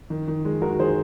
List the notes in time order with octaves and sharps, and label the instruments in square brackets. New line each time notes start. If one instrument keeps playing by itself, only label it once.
[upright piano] D#3
D#3
G#3
D#3 F#4 A#4
D#3 G#4 C5